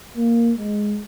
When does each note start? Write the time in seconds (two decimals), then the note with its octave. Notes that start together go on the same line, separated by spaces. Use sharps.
0.17 A#3
0.56 G#3